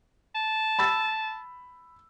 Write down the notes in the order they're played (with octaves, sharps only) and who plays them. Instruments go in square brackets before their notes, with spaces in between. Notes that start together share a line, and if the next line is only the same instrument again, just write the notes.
[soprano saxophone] A5
[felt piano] B5 E6 A6